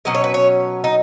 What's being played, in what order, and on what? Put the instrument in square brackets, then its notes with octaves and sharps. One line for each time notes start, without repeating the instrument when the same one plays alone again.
[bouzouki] B2 F#3 C#4 D#5
C#5
B4
C#5
D#4